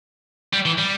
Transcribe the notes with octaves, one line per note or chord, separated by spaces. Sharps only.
G3
E3
G3